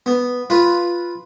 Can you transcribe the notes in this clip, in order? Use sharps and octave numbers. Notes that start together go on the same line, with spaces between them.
B3
F4 B4